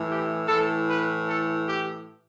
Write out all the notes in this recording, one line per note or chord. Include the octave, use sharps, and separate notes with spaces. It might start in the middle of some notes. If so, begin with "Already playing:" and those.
Already playing: A2 E3
G4
A2 E3 A4
B4
A4
G4